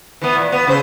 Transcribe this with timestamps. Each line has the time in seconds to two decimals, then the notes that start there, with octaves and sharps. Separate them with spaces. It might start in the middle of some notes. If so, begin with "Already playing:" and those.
0.22 E3 B3
0.36 A#2
0.52 B3
0.67 C#3 C5